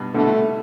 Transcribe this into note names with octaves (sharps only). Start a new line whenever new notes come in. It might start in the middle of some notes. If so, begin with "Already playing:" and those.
Already playing: G2 B2
B2 D3 A3